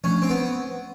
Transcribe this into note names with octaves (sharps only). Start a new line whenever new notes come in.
F3 A3 C#4 D4
C4
B3